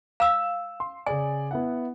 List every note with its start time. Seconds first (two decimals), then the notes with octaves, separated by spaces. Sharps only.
0.20 F5 E6 E7
0.80 C6
1.06 C#3 G#4 D5 G#5
1.51 B3 E4 F#5